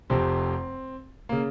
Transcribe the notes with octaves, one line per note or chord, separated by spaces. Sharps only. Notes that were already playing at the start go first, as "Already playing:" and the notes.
F1 F2 C3 C4
C#3 A#3